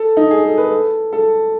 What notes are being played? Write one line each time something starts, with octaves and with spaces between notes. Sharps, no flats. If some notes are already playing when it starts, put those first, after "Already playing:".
Already playing: A4
D#4
G#4
A4
B4
A4
A4